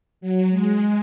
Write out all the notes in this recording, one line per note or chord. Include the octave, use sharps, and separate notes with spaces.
F#3
G#3